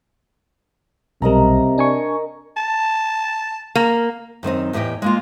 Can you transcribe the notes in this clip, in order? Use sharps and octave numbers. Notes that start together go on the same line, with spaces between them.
B1 C3 G3 A#4 D#5 A#5
D4 G#5 C#6
A5
A#3
F#2 D#3 C4 D#4
E2 A2 G4 D#5 G5
G#3 A#3 F4